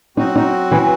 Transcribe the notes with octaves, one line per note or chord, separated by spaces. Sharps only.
F#3 C4 D#4 F#4
D#4
E3